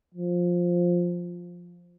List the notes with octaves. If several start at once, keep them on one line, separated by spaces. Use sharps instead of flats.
F3